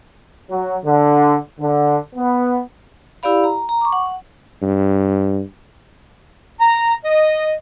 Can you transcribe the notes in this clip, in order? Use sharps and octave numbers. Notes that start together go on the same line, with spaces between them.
F#3
D3
D3
B3
E4 G4 D5 F5 B5
A#5
A#5
C#6 D6
F#5
G2
A#5
D#5